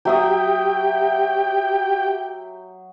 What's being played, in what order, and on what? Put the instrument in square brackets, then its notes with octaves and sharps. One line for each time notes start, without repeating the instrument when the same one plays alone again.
[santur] F#3 E5 D#6 [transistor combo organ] G4 G5